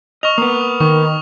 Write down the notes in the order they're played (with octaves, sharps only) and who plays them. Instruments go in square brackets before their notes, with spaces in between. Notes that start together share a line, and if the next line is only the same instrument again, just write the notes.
[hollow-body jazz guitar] D#5 [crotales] C#6 F6 F7
[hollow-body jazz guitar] A#3 B3 [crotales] D#6
[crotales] D#6
[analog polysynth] D#3 [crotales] C#6